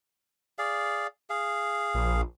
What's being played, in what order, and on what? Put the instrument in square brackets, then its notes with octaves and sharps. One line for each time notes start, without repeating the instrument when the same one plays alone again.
[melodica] G#4 D5 F5
G#4 F5
[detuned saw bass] A#1